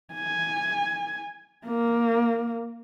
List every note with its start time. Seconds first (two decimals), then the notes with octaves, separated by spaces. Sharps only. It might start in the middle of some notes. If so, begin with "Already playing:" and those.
0.14 G#5
1.66 A#3